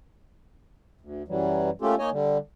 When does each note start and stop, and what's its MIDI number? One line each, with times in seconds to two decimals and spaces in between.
1.01 1.23 38
1.28 1.70 42
1.28 1.70 52
1.28 1.70 54
1.28 1.70 55
1.82 1.95 57
1.82 1.95 58
1.82 1.95 61
1.82 1.95 65
1.82 1.95 67
1.82 1.95 69
1.99 2.10 58
1.99 2.10 63
1.99 2.10 73
1.99 2.10 75
1.99 2.10 80
2.12 2.38 50
2.12 2.38 55